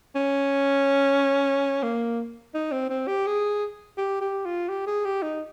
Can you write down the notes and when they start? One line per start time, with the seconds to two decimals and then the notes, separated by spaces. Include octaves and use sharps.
0.16 C#4
1.83 A#3
2.54 D#4
2.72 C4
2.90 C4
3.08 G4
3.26 G#4
3.98 G4
4.21 G4
4.45 F4
4.69 G4
4.87 G#4
5.05 G4
5.22 D#4